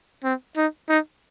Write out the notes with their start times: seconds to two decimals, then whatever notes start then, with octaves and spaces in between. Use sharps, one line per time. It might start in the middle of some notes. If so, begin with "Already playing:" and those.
0.24 C4
0.57 D#4
0.89 D#4